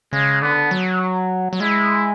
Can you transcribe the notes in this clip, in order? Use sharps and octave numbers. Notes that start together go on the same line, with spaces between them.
C#3 G#3
D3 B3
F#3
F#3
G#3 E4